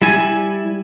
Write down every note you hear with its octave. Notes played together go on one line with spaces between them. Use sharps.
G3 E4 G#5